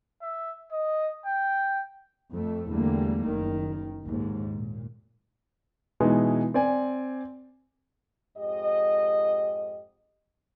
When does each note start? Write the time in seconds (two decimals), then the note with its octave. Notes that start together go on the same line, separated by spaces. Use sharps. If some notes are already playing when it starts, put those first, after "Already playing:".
0.22 E5
0.72 D#5
1.26 G5
2.32 F2 A3
2.70 E2 D3 G3 A3 A#3
3.25 F#1 D#3
4.03 A#1 D#2 G#2
4.52 A#2
6.00 B2 E3 G#3 D#4
6.54 C4 D5 G#5
8.37 F2 G#2 G4 D#5